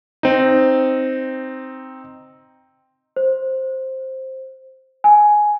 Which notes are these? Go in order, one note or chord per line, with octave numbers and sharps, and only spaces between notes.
C4 D#4
C5
G#5